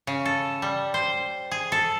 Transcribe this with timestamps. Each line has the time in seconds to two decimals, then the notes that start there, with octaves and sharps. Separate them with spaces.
0.07 C#3
0.25 A4
0.62 G3
0.94 C5
1.51 G#4
1.72 A4